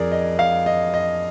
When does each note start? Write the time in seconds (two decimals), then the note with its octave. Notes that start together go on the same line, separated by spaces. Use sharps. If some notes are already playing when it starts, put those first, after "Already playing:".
Already playing: F2 G#4 A#4 D5
0.11 D#5
0.39 F5
0.66 D#5
0.94 D#5